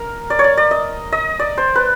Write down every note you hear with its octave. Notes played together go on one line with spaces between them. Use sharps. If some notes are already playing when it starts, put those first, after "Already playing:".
Already playing: A#4
D5
C#5
D5
D5
D#5
D#5
D5
C5
B4